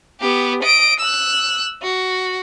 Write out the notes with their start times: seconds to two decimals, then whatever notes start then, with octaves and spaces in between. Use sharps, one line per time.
0.20 B3 G4
0.62 D#5 D7
1.00 E6 F#6
1.82 F#4